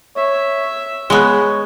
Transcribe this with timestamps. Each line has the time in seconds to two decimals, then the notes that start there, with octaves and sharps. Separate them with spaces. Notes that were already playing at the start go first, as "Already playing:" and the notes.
0.16 C#5 E5
1.10 G#3 B3 C#5